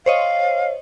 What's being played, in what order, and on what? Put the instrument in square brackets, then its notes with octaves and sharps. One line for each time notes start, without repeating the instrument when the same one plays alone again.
[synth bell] C5 C#5 D#5 [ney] F5